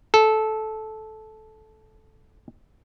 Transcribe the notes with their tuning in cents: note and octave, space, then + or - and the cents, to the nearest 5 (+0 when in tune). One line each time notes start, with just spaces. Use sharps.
A4 -15